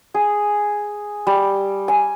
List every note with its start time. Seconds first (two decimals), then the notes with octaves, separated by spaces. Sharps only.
0.14 G#4
1.27 G3
1.88 G#5